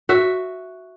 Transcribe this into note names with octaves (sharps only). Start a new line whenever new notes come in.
F#4 E5